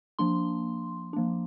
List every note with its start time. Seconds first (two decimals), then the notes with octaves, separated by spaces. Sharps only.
0.19 F3 A#3 D4 C6
1.13 F3 A#3 D4